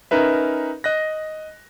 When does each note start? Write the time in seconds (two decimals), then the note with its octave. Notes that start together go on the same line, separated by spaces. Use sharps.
0.11 C#4 D#4 A#4 B4 E5
0.84 D#5 F#6 A#6